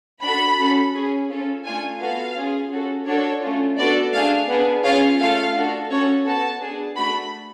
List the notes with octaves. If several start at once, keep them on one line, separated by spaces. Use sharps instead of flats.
D4 F#4 A4 B5
C#4 F#4 A4
C#4 G#4
C#4 F4 A4
A3 D4 F4 G#5
B3 F#4 A4 F5
C#4 F4 G#4
C#4 F#4 A4
D4 F#4 A4 C#5
A3 C#4 F4
B3 D4 F#4 A4 D5
A3 D4 G#4 F5
B3 D4 G#4
C#4 F4 G#4 F5
A3 F4 A4 F5
D4 F#4 A4
C#4 F#4 A4 C#5
B3 F#4 A4 A5
B3 D4 G#4
A3 D4 F#4 B5